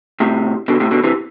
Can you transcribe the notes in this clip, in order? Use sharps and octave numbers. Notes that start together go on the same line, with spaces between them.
A2 C3
B2 D3
A2 C3
B2 D3
C3 E3